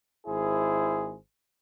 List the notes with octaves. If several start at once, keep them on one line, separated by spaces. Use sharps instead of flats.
G#1 E4 G#4 C5